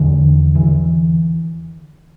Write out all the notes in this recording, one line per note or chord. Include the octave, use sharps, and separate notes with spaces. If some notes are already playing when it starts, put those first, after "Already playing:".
Already playing: E2 D3 E3
E3